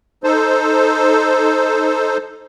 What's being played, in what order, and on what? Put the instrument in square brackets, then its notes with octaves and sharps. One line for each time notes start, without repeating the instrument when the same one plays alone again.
[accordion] D#4 A4 C5